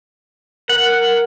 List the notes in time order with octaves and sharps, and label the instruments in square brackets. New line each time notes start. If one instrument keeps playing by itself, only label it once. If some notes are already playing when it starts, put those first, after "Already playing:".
[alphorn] A#4 [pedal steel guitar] F#5